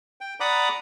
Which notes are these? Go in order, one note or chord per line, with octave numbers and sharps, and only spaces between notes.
G5
D5 F#5 A#5 B5 D6 D#6